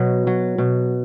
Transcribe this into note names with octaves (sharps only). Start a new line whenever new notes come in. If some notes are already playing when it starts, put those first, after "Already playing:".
Already playing: B2 F#3
F#3
B2